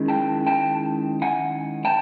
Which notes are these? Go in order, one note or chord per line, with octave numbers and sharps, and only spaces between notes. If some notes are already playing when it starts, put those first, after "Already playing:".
Already playing: D#3 G#3 C#4 E4
G5 A5
G5 A5
F#5 G#5
G5 A5